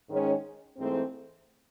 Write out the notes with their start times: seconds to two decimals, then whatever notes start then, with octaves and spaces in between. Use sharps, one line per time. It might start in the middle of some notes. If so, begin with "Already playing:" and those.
0.09 G#2 D#3 G#3 C#4
0.77 G#2 E3 A3 C4